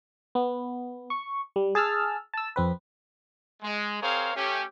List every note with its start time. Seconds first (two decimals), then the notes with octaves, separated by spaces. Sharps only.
0.35 B3
1.10 C#6
1.56 G3
1.75 G#4 A5 E6 F6
2.34 A5 E6
2.56 F2 C4 B4
3.62 G#3
4.02 C4 G#4 A#4 C5 C#5 F5
4.34 A3 C#4 G4